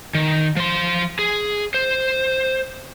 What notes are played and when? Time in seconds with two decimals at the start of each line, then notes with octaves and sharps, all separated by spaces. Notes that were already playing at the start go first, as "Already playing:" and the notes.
0.15 D#3
0.57 F3 C6
1.19 G#4
1.74 C5